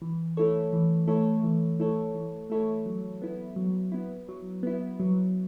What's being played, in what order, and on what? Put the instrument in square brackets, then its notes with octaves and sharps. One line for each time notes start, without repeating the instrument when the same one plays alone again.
[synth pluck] E3
A3 E4 A4 C#5
E3
A3 E4 A4 C#5
E3
A3 E4 A4 C#5
E3
A3 E4 A4 C#5
F#3
B3 E4
F#3
B3 E4
F#3
B3 E4
F#3